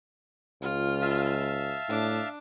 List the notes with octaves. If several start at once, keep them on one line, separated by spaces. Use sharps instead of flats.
C#2 F4
E5 F5 A5
A2 D4